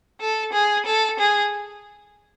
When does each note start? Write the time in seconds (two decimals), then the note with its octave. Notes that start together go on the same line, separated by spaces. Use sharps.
0.20 A4
0.53 G#4
0.86 A4
1.18 G#4